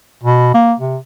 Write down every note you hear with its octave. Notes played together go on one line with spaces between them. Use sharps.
B2
A#3
C3